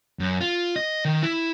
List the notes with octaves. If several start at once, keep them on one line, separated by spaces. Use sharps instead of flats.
F#2
F4
D#5
D#3
E4